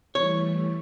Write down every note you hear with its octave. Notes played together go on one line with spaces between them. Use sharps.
E3 G3 A3 C#5